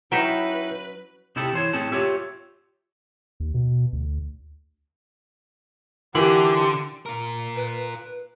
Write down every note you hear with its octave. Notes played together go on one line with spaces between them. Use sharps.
F#3 C#4 D#4 E4 B4 E5 G5
C3 D#4 E4 G4 A4
E3 C5 C#5
A2 C4 C#4 G#4 A5
F4 G4 C#5 E5
D#2
B2
D2
D3 E3 F4 G4 A#4 F#7
F4 A#4
B4